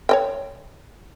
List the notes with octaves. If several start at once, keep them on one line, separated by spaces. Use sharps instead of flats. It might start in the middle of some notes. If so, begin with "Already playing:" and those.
C#5 D#5 G5